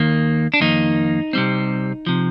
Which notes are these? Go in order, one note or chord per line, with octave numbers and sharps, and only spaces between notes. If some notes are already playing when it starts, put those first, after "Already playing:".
Already playing: D#2 D#3 A#3
D4
F2 D#3 A#3 D#4
C3 G3 C4
C3 F3